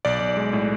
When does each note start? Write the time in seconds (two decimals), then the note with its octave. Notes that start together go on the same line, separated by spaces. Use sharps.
0.05 B1 D5
0.20 B1
0.37 G#3
0.53 A2